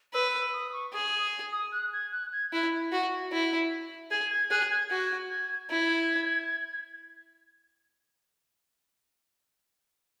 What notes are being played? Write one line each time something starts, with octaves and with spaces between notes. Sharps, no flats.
B4 E6
E6
D#6
C#6
G#4 D#6
D#6
D#6
F#6
G#6
F#6
G#6
E4
F#4
E4
G#4 G#6
G#6
G#4 F#6
G#6
F#4 G#6
G#6
E4 G#6